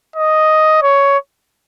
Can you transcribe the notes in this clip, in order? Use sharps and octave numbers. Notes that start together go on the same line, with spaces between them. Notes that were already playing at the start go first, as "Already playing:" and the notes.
D#5
C#5